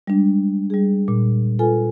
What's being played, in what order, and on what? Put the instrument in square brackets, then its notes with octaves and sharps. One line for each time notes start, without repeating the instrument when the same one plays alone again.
[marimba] G3 G#3 D4
G3 G#4
A#2
F4 A4 B4 G#5